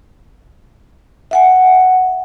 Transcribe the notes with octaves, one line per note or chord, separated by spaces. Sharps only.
E5 F#5 G#5